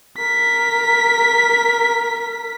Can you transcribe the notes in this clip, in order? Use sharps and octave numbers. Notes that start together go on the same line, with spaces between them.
A#4 B6